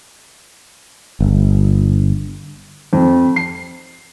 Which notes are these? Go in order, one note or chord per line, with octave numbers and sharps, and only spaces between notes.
G1
F2
C7